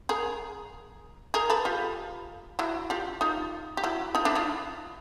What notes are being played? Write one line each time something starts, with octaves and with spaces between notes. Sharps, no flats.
G#4 A#4
G#4 A#4
A4 B4
F4 G4
E4 F#4
F4 G4
D#4 F4
G4
E4 F#4
D#4 F4
D4 E4
D#4 F4